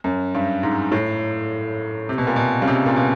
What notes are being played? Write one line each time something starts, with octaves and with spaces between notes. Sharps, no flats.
F#2
G2
G#2
A2
C3
B2
A#2
B2
C#3
C3
A#2
B2